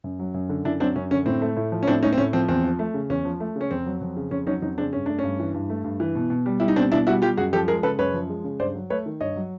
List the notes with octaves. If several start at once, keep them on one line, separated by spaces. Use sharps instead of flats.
F#2
F#3
F#2
D3
F#2 D4 E4
F#3 C4 D4
F#2 C#4
D3 C#4
A2 C4
A3
A2
F3
C#4
A2 C4 D4
A3 C#4 D#4
C4
A2 C#4
F3 C4
E2 C4
F3
A3
C#3
E2 C#4
F3
A3
C#3
C#4
F2 C4
F#3
F2
C#3
F2 C#4
F#3 C#4 D#4
F2 C#4 D#4
C#3 C4 D4
G2 C#4
A3 D4
G2 C#4
E3
G2
A3
G2
E3
B2
B2
G3
G3 E4
D#4
B2 C4 D4
B2 D4 E4
G3 E4 F#4
G3 F4 G4
F#2 F#4 G#4
F3 G4 A4
G#3 G#4 A#4
C#3 A4 B4
F#2 B4 C#5
F3
G#3
C#3
G2 C5 D5
F#3
A3 B4 C#5
D#3
G2 C#5 D#5
F#3